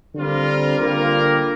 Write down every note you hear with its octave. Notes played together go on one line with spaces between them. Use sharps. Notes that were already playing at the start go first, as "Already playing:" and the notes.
D3 G3 C4 F4 A#4
D3 G3 A#3 F4 A#4